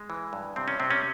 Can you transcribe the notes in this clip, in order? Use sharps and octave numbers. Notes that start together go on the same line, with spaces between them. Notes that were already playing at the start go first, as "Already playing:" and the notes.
Already playing: G#3
E3
G2
C3 C4
C#4
C3 C4
C#4